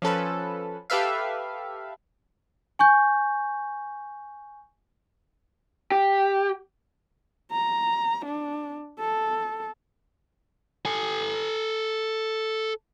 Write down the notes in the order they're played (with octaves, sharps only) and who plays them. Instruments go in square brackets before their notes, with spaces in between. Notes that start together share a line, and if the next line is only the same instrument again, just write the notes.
[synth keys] F3 C#4 A4 B4
G4 A4 B4 E5 F5
[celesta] G#5 C#6 G6
[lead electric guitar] G4
[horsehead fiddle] A#5
D4
A4
[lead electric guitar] A4 G#5